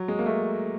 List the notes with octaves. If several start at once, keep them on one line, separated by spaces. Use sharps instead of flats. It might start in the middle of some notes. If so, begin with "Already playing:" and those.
Already playing: F#3
G#3
A#3
A3